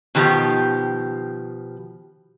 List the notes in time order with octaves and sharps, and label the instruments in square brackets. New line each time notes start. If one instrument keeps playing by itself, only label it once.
[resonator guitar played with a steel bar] B2 D#3 F3 G4